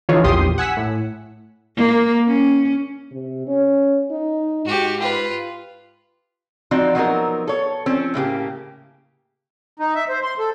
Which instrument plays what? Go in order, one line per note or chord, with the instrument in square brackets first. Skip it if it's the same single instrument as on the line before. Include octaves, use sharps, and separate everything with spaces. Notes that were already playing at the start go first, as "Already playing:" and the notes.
[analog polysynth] D3 E3 F3 D#4 F4 C#5
A#1 E2 G4 C6 D#6
F#5 G#5 E6 B6
A2
[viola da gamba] A#3
C#4
[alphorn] C3
C#4
D#4
[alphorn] G#2 [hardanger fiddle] F#4 G4
[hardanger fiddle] F4 B4
[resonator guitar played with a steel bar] F3 C4 D#4 F#4 D5
F3 F#3 B3 C4 D#4 A#4
A4 C#5
F3 C4 C#4
A2 C#3 A#3 G4
[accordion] D#4
E5
C5
C6
A4